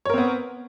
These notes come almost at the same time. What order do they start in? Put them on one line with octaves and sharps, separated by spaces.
C#5 A#4 C4 B3